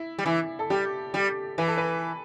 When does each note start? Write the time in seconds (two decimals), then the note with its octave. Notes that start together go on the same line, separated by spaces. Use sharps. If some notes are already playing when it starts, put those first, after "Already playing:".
Already playing: E4
0.19 G3
0.26 E3 E4
0.59 A4
0.70 G3 G4
1.14 G3 G4
1.58 E3 B4
1.68 A4
1.78 B4